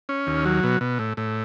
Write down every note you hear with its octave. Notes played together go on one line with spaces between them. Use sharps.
C#4
D#2
F#3
B2
B2
A2
A2